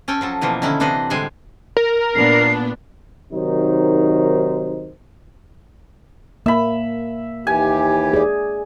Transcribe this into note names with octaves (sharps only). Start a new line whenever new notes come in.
C#4 A4 G5 G#5
F3 F#3 A4
B2 E3 F3 A#3
D3 D#3 C#4 D#4 E4
C3 E3 D4 C5 D#5 F#5
A2 D3 G3 G#3 C5 G#5
A#4
A#2 B3 D4 C7
C3 D#3 F#3 D#4 A#4 C5
A#3 E5 B5
D#2 E3 G4 G#5
G#4 D5